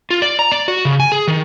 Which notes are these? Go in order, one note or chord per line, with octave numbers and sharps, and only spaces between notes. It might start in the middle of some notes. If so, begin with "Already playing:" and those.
F4
D5
A#5
D5
F#4
C#3
G#5
G#4
D#3